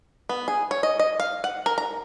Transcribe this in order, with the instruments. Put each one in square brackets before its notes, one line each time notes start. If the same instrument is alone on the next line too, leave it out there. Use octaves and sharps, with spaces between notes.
[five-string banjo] B3
G#4
C#5
D#5
D#5
F5
F#5
A#4
A#5